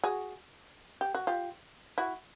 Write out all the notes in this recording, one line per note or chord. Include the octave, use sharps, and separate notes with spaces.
F#4 G#4
G4
F#4
F4 G4
E4 F#4